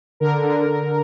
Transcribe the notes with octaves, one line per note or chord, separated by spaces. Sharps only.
D3 A#4
D3
D3